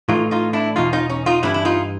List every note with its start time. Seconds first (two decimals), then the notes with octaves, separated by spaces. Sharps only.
0.09 A2 E3 D#4 F4
0.31 D#4 F4
0.53 D4 E4
0.76 E2 B2 D#4 F4
0.93 D#4 F4
1.10 C#4 D#4
1.26 D#4 F4
1.43 G2 E3 D4 E4
1.54 E4
1.65 D#4 F4